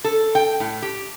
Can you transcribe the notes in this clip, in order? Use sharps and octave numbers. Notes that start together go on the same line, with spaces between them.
A4
G5
A2
G4